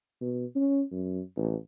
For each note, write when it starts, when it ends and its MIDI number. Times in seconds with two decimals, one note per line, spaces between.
0.21 0.45 47
0.56 0.82 61
0.92 1.20 42
1.37 1.55 33